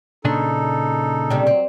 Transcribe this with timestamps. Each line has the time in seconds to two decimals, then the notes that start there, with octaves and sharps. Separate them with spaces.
0.25 A#2 C#3 D4 D#4 A4
1.30 C3 G3
1.47 F#3 C4